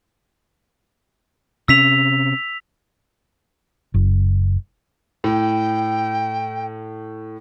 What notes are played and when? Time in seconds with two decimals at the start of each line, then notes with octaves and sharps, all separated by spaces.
1.68 C3 C#4 E6 B6 F7
3.94 F#1
5.24 A2 G5